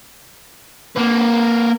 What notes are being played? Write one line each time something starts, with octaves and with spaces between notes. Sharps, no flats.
A#3 B4